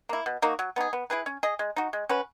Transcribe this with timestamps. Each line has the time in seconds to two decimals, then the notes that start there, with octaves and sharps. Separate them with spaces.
0.09 A#3 E4
0.26 B2
0.42 A#3 D#4 F#4
0.59 F#3
0.76 B3 D#4 G#4
0.93 B3
1.10 E4 G#4 B4
1.26 C#4
1.43 G#4 D#5
1.59 G#3
1.76 D#4 F#4
1.93 G#3
2.09 C#4 F#4 B4